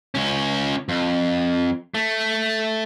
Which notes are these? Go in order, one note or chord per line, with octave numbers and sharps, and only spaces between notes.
C#2 C#4
F2
A3